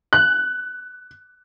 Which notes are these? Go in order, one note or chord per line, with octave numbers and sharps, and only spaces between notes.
F#6